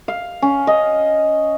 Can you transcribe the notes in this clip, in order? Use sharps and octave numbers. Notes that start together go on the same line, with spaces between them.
F5
C#4
D#5